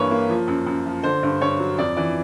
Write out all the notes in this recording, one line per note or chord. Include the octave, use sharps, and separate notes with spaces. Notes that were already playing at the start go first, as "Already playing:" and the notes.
Already playing: G2 E3 A#3 B4 C#5
A#3
F3
F#2
F#2
F3
D3 C5
G2
G2 C#5
F#3
F2 D5
E3 D5